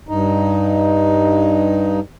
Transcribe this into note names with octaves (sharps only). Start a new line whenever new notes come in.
G2 D#4